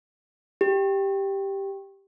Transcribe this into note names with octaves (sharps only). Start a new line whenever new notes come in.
G4